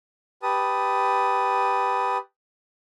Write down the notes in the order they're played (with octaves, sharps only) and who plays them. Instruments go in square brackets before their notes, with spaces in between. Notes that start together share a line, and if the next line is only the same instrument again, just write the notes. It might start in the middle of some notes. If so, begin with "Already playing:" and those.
[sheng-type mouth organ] G4 B4 A5 D#6